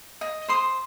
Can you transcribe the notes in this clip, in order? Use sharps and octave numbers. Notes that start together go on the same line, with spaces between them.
D#5
C5 C6 D#6